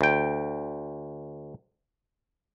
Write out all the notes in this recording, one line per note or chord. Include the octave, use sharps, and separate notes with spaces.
D2 G5